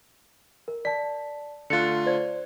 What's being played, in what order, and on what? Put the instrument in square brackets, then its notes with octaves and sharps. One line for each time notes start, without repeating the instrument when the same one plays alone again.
[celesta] A#4
[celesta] D5 A5 [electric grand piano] B6
[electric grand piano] D3 A3 F4 [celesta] F#6 A6 C#7
[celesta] C5 D5 G#6